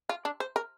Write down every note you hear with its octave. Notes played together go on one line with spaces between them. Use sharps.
F4
D4
C5
A#4